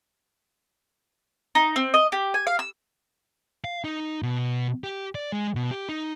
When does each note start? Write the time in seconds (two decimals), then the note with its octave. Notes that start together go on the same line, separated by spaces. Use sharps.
1.55 D#4
1.76 C4
1.94 D#5
2.12 G4
2.34 G#5
2.47 F5
2.59 E6
3.64 F5
3.84 D#4
4.22 B2
4.84 G4
5.15 D5
5.32 G#3
5.55 B2
5.71 G4
5.89 D#4